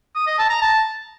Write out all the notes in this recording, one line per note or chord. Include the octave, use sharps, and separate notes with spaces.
D#6
D#5
A5
A#5
A5